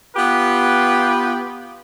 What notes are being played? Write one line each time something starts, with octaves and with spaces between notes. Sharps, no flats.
B3 F4 G4 B4